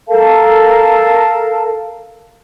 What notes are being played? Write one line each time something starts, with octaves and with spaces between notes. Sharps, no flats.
A4 A#4 F5 A5